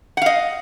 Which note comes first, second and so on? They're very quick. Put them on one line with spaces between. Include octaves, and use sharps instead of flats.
F#5 F5 D#5